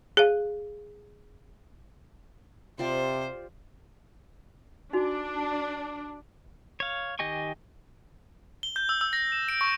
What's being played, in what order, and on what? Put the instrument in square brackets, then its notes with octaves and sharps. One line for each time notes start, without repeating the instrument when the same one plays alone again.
[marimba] G#4 F5
[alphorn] C3 [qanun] F4 G4 D5 [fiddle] C5
[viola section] D4 [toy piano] D#4 F#4
[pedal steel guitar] C#5 F5
D#3 G4 D#5 G#5 C#6
[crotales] G7
G6
E6
E6
A#6
E7
D7
C#6